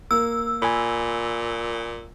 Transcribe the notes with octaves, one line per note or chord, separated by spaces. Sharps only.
A#3 E6
A#2 G#5 B5